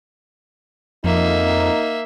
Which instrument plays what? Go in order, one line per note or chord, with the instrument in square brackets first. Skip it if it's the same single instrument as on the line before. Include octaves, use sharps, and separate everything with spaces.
[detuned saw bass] F2 [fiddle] A#3 E5 [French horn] D#4